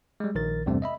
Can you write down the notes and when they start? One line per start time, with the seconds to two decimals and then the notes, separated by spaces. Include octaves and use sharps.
0.20 G3 G#3
0.35 A#1 D#3 A#4 A6
0.66 E2 G2 C3 G3 A3 C4
0.82 D#5 E5 B5